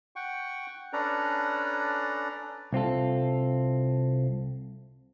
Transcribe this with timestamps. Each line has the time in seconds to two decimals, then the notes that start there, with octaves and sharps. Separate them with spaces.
0.16 F#5 G5 C#6
0.93 C#4 D4 A4 B4 D5 A#5
2.73 C2 C4 F4 A4